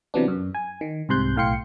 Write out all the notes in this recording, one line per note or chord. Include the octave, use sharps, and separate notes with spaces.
C3 E3 F#3 B3 D4
F#2
G#5
D#3
C2 G#2 C3 C6 F#6 G6
B1 A2 F5 G5 C6 C#7